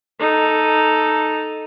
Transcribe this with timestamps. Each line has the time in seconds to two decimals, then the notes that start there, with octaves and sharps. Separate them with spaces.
0.20 D#4 A4